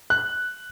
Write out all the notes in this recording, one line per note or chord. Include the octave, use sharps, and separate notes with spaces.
F#6